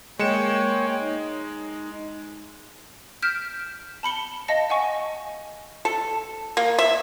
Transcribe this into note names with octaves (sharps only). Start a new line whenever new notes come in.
G#3 A#3 C#5 G5 C#7 E7
D#4
F6 G6 B6 D7 E7
A5 B5 C#7 G7
D#5 F5 A5 A#6 C#7
D#5 F#5 G#5 C#6
A4
A#3
E5